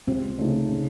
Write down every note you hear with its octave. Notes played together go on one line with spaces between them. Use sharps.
C#2 C3 C4
C#3 A3 D#4 A4
C#3